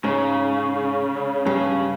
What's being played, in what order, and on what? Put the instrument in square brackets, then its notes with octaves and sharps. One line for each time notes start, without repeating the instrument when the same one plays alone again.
[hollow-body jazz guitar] G#2 [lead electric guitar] C#3
[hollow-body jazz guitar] G2 [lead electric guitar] C#3